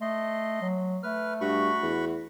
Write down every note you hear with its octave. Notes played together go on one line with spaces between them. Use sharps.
A3 D#5 C6
F#3
A3 B4 F6
G2 F#4 B5 C#6
E2